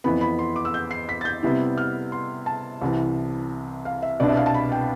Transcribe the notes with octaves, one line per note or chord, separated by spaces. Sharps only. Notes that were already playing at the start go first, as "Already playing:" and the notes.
F2 E3 B3 B5
B5
C6
D6
E6
G6
C7
B6
A6
G6
C3 G3 B3 E4
F6
C6
A5
C2 C3 E3
F5
E5
C2 B2 B3 D4 D5
E5
F5
A5
B5
G5